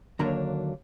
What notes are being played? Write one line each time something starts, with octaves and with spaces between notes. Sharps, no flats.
D#2 D3 F#3 A#3 D4 A#5